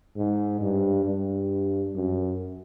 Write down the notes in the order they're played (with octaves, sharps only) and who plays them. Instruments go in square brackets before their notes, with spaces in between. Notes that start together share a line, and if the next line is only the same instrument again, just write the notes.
[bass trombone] G#2
G2
G2
F#2